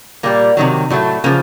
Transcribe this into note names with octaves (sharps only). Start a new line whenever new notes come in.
A#2 G3 A#3
C3 D#3 F#3
A2 F#3 A3
C#3 F3 A#3